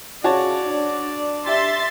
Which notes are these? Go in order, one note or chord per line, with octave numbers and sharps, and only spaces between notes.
C#3 F#4 C#5 D5 A5
D4
G4 E5 C6 A6